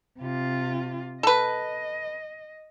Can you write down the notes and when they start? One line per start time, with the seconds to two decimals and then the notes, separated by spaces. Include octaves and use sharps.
0.18 C3 F4
1.23 A4 B4 D#5